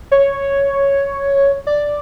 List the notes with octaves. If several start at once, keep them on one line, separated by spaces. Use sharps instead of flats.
C#5
D5